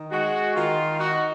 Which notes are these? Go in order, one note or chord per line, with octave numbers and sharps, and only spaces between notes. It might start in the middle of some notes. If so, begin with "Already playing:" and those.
Already playing: D#3
G#3 F#4
D#3 F4
D#4 F#4